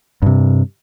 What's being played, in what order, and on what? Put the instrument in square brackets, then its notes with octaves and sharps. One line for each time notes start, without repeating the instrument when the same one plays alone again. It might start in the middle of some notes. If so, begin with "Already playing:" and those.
[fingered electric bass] G2 C3